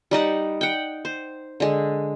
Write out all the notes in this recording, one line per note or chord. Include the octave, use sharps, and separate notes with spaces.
G3 D#4 D#5 F#5
F#5 G5
C5
D3 G#3